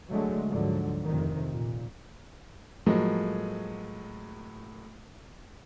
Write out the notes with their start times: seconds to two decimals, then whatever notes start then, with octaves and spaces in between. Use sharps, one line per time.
0.11 D3 F#3 G#3 A3
0.49 D2 G#2 D3 F3 F#3
1.05 F1 C3 D#3
1.53 A#2
2.86 A2 F3 F#3 G#3 A#3